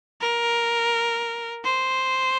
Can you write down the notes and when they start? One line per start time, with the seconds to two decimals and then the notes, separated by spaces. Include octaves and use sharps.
0.21 A#4
1.64 C5